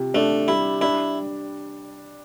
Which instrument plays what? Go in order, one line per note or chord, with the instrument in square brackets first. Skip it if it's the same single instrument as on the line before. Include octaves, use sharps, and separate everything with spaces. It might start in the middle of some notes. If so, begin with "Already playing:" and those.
Already playing: [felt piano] C3 F4
[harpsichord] A3 [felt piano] D4
[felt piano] G3 [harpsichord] E4
[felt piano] D4 [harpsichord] E4